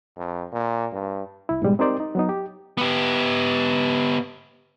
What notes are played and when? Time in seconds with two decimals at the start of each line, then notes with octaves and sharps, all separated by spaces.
0.17 F2
0.52 A#2
0.92 G2
1.49 C2 E4
1.62 G#2 B2 G3 G#3
1.79 C4 D#4 G4 A#4 C5 D5
2.00 D#4
2.15 F#3 B3 D#4
2.29 G4
2.78 B3 G4